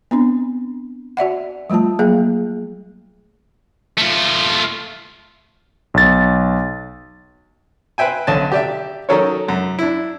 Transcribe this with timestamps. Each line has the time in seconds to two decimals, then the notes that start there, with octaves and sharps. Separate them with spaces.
0.11 B3 C4 D4
1.17 F#4 D5 E5 F#5
1.70 F3 G3 A3 F4 A5
1.99 F#3 A#3 G#4 F5
3.98 A3 F4
5.94 B1 A6
7.98 B4 C5 E5 G5 G#5
8.27 B1 D3 C#4 A5
8.52 G4 D5 E5
9.09 D#3 F#3 C#4 A4 A#4 C#5
9.48 F#2
9.79 D4 E4